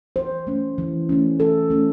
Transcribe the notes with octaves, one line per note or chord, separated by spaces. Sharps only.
E3 C5
A3 C#4
E3
A3 C#4
E3 A4
A3 C#4